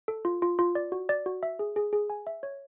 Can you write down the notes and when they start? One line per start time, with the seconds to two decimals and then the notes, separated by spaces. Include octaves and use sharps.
0.08 A4
0.25 F4
0.42 F4
0.59 F4
0.75 D5
0.92 F#4
1.09 D5
1.26 F#4
1.43 E5
1.59 G#4
1.76 G#4
1.93 G#4
2.10 G#5
2.27 E5
2.43 C#5